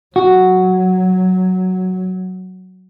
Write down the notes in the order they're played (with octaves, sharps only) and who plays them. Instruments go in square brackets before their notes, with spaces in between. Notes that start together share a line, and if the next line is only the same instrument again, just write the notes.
[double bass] F#3 [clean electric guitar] F#4